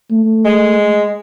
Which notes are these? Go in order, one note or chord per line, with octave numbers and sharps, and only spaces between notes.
A3
G#3